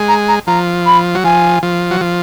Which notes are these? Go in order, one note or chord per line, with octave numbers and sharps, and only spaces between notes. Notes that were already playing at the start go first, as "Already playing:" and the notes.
Already playing: G#3
A#5
A#5
F3 A#5
B5
F#3
F3 G#5
F3
F#3
F3